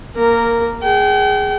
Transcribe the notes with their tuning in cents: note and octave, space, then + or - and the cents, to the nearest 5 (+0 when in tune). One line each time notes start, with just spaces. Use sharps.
A#3 +0 A#4 -10
G#4 +0 G5 -40